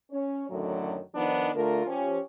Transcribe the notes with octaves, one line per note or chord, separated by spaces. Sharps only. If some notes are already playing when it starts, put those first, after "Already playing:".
C#4 C#5
F#2 A2 D3 D#3 F#3
D#3 F3 B3 D4 D#4
D3 A3 F4 A#4
F3 C#4 G4